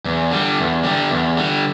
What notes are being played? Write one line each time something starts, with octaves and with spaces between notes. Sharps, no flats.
E2
D3 G3
E2
D3 G3
E2
D3 G3